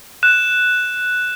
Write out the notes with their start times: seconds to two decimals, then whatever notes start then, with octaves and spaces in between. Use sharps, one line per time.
0.23 F#6 E7